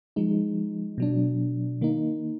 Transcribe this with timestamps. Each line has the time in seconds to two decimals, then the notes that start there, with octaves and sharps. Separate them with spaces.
0.16 F3 G#3 D#4
0.98 B2 F#3 D4
1.81 D#3 A#3 D#4